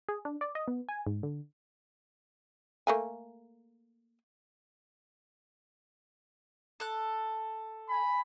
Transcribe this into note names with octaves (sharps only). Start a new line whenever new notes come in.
G#4
D4
D5
D#5
B3
G#5
G#2
D3
A3 A#3 G#5
A4 F#6
G#5 B5